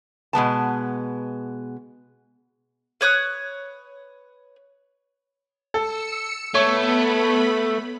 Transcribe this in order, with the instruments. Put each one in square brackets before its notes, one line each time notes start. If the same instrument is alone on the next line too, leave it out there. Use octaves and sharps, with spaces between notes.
[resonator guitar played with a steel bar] B2 G#3 B3 A5
[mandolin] B4 C#5 D#6 F#6
[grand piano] A4 [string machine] E6 C#7
[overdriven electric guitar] A3 [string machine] B3 B5 [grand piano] C#5 C#6